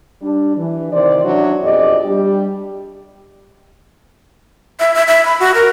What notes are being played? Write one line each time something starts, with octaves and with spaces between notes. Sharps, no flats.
G3 D4
E3
C3 D#3 E4 C5 D5
F#3 C#4 D4 E4
F2 B2 G4 G#4 D5 D#5
G3 D4 G4
E5
E5
E5
B5
F#4
A#4